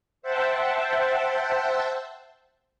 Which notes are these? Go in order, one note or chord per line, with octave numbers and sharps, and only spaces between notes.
C5 E5 F#5 G5 A5